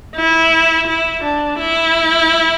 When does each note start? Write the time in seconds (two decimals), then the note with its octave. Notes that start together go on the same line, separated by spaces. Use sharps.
0.16 E4
0.87 E4
1.24 D4
1.59 E4